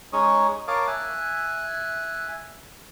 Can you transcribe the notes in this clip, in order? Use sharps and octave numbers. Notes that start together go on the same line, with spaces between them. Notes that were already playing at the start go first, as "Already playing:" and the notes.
G#3 C#4 D#4 C#5 C#6 D#6
A#4 C#5 F5 A5 D6 D#6
E5 G#5 F#6